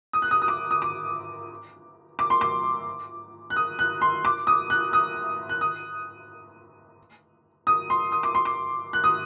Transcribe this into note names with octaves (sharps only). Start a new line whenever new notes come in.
D#6
F#6
D#6
D#6
D6
D#6
D6
D6
C6
D6
F#6
D#6
F#6
C6
D6
D#6
F#6
D#6
F#6
D#6
D#6
C6
D#6
D6
C6
D6
F#6
D#6